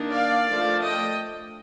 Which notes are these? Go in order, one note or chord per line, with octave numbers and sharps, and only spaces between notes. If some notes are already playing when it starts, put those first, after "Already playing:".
Already playing: D#3 A#3 D4
D5 F5
F3 A3 D4
D#5 G5